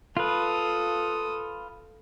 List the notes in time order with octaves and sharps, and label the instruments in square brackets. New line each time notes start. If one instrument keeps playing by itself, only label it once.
[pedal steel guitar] F4 B4 [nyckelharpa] A4 D#6